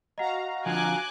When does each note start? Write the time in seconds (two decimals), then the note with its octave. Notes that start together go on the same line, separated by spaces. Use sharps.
0.18 F#4 D#5 F5 F#5 A#5
0.66 D3 F3 G#5 D6 F#6